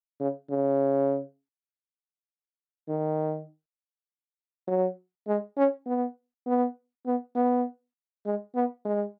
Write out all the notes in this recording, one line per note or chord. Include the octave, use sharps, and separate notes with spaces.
C#3
C#3
D#3
F#3
G#3
C#4
B3
B3
B3
B3
G#3
B3
G#3